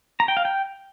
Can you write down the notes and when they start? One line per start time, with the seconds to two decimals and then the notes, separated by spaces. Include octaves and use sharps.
0.20 A#5
0.28 G5
0.37 F5
0.45 G5